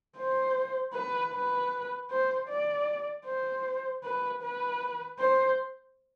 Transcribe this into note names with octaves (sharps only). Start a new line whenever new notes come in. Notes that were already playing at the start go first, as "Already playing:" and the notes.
C5
B4
B4
C5
D5
C5
B4
B4
C5